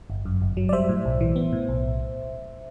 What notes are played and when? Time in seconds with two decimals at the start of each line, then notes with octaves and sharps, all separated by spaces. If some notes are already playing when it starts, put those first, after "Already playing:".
0.10 G1
0.25 F#2
0.42 G1
0.57 F#3
0.69 D5
0.72 G3 C5 E5
0.89 A2
1.05 B1
1.21 E3
1.36 B3
1.53 A2
1.68 B1